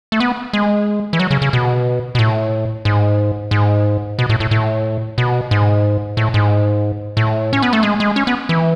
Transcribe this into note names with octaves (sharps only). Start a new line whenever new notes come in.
A3
B3
G#3
E3
F#3
C#3
C#3
B2
B2
A2
G#2
G#2
B2
A2
A2
A2
B2
G#2
A2
G#2
A2
C#4
B3
A3
G#3
G#3
C#4
B3
E3